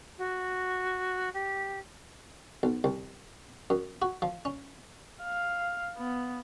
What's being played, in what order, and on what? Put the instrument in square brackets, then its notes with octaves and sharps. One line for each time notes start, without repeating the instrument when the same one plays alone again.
[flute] F#4
G4
[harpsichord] B1
C2
F#2
F#4
F3
C#4
[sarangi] F5
B3